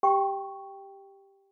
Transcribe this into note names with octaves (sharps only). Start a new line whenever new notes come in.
G4 G5 C#6